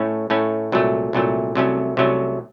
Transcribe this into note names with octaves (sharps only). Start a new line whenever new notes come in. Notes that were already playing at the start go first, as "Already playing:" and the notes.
Already playing: A2 A3 C#4
A2 A3 C#4
C2 A#2 F#3 A3
C2 A#2 F#3 A3
C2 C3 F#3 A3 C#4
C2 C3 F#3 A3 C#4